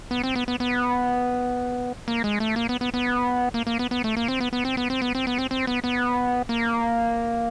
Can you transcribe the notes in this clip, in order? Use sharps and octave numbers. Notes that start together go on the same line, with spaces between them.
B3
C4
B3
B3
B3
A#3
G#3
A3
A#3
B3
B3
B3
A#3
A#3
B3
B3
A3
A#3
C4
B3
B3
C4
B3
C4
B3
C4
B3
C4
C4
B3
B3
A#3